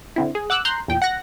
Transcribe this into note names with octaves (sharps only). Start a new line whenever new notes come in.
D3 C4 E4
G#4
F#5 D6 E6 F#6
A#5 C6 F#6 G6
E2 A#2 G5
F#5 F#6 A#6